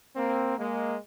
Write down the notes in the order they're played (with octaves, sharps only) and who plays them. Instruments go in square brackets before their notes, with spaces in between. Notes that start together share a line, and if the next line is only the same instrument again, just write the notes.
[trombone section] A#3 C4
G#3 A#3